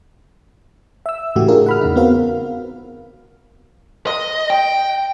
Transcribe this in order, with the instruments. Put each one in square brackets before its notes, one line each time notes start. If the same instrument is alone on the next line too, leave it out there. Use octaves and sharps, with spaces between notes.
[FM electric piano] E5 E6
A2 C#3 E3 A3 F#4 G4
D4 E4 F4 G#4 A#4
F#5 B5 F6
E2 C#3 D#4
B3 C4 F#4 A#4 F5
[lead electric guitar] D#5
G5